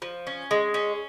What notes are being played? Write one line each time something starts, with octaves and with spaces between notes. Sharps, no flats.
F3
C#4
G#3
C#4